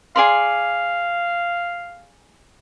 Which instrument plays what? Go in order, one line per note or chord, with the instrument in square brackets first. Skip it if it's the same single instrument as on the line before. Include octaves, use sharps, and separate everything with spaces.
[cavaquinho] G#4 D5 C6 [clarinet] F5